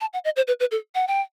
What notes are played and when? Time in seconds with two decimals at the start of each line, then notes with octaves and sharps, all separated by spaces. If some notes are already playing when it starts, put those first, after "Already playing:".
0.01 A5
0.13 F#5
0.25 D#5
0.36 C5
0.48 B4
0.60 B4
0.71 A4
0.95 F#5
1.08 G5